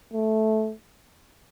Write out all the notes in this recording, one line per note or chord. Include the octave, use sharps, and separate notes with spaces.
A3